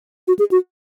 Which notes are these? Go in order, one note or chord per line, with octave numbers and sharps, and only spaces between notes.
F#4
G#4
F#4